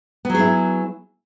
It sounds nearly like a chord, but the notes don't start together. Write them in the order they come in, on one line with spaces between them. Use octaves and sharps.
B3 F#3 G#4 E4